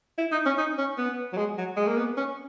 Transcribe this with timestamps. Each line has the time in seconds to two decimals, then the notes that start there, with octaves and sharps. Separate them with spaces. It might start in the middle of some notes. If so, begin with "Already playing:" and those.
0.18 E4
0.32 D#4
0.46 C#4
0.58 D#4
0.78 C#4
0.98 B3
1.33 F#3
1.37 G#3
1.58 F#3
1.77 G#3
1.87 A#3
1.97 B3
2.17 C#4